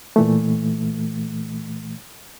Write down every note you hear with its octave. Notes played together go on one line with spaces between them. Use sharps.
A#2 E3 A3